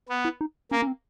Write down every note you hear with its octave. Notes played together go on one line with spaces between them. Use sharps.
B3
E4
D#4
A#3 C#4
C#4
C4